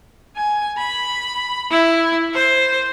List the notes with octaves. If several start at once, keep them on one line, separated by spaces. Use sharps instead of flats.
G#5
B5
E4
C5